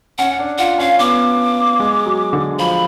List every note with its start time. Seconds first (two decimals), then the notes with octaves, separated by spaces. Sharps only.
0.18 C#4 F#5
0.39 D4
0.58 F4 F#5
0.78 C#4 F5
0.99 B3 D6
1.80 G#3
2.06 F#3
2.33 D3
2.59 F3 B5